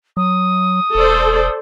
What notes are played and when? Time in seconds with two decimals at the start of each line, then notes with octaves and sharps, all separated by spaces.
0.17 F#3 D#6
0.95 E1 A4 C5 D5